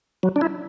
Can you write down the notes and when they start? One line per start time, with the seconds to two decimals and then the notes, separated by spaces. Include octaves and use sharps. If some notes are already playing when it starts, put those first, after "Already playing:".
0.23 F#3
0.36 D4
0.41 E4